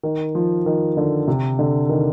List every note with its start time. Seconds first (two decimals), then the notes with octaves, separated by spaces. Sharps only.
0.03 D#3
0.35 F3
0.66 D#3
0.97 D3
1.28 C3
1.59 D3
1.89 D#3